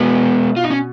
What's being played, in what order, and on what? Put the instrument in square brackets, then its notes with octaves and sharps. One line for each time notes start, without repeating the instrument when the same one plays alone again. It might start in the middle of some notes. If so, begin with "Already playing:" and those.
Already playing: [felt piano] B2 [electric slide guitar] G#3 B3
[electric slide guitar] F4
D#4
C#4